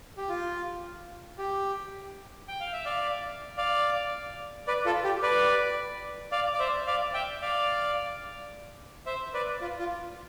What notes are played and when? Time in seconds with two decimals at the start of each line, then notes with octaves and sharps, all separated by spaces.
0.17 G4
0.29 F4
1.38 G4
2.48 G5
2.60 F5
2.73 E5
2.85 D5 F5
3.57 D5 F5
4.67 B4 D5
4.86 F4 A4
5.04 G4
5.22 B4 D5
6.32 D5 F5
6.54 D5
6.59 C5 E5
6.86 D5 F5
7.14 E5 G5
7.42 D5 F5
9.06 C5 E5
9.33 B4 D5
9.61 F4
9.79 F4